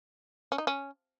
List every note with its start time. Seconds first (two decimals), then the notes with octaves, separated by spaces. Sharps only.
0.52 C#4
0.58 D#4
0.67 C#4